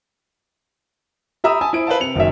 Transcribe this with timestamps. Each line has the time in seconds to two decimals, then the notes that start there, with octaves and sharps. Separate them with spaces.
1.44 G4 E5 A#5 B5 D#6 E6
1.61 G#5 A5 D#6
1.73 E4 C5 D#6 D7
1.87 B4 C5 F5 A5
2.00 C3 C#7 F7
2.15 F#1 D#3 F#3 E5